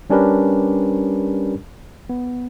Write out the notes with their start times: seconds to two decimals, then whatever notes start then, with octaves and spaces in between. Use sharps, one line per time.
0.10 G3 C#4 D4 G4 A#4 B4
2.09 B3